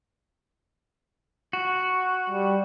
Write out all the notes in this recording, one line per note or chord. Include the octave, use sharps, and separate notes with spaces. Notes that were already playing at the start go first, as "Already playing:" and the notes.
F#4
G3